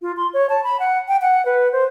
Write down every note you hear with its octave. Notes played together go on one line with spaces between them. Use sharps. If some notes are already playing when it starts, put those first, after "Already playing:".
F4
C6
C#5
A5
B5
F#5
G5
F#5
B4
C5